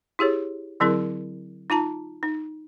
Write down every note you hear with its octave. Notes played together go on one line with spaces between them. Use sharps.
E4 G4 G#4 C#5
D3 F#3 C4 E4 G#4 A#4
D#4 F4 A5 A#5
D#4